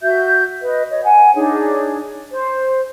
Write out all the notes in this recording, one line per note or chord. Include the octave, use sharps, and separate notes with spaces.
F#4 E5 G6
B4 D#5
C#5 D#5
F#5 G#5
D4 D#4 G#4 C#5
C5